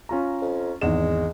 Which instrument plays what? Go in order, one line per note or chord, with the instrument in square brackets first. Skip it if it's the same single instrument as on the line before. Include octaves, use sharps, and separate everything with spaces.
[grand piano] C#4 F4 A#5
[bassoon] F2
[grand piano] G#1 E2 E7 [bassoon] G#3